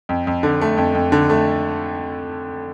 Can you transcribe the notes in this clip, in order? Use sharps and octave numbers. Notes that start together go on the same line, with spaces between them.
F2
F2
D3
A3
F2
F2
D3
A3